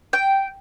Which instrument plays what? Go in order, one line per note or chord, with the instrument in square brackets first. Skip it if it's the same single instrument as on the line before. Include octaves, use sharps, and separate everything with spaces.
[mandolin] G5